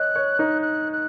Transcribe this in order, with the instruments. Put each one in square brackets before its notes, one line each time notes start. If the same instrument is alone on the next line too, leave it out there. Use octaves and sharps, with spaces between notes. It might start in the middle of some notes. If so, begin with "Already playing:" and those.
Already playing: [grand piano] C#5 D#5 [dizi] F#6
[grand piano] C#5
D#4
[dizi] F#6
F#6